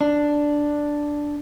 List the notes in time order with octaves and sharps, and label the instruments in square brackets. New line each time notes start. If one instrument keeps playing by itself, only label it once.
[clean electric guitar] D4